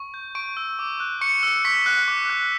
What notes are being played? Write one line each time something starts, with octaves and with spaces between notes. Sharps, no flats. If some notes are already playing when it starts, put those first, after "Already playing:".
Already playing: C#6
G6
C#6 D7
E6
D6
F#6
C#6 C#7
E6
C#6 B6
F#6
D6
F#6